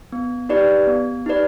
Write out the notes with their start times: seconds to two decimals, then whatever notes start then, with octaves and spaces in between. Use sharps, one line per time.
0.12 B3
0.49 D#4 G4 B4 D5
0.87 B3
1.26 D#4 G4 B4 D5